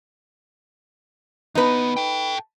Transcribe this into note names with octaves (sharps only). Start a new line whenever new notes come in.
D#2 B3 D#4 B4
A4 G5